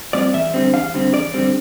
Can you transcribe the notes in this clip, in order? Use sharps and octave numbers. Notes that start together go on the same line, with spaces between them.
A#2 G3 C4 D5
E2 E5
D3 G3 C4
E2 F5
D3 G3 C4
E2 D5
D3 G3 C4